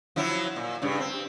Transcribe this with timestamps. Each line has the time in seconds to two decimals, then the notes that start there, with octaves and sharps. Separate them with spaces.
0.16 F3 F#3 E4
0.56 A#2
0.82 G2 C#3
1.00 C4